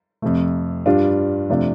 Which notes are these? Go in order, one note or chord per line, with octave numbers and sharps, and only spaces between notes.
F2 C3 A3
G2 G3 D4 F4
F2 C3 A3 D4 F4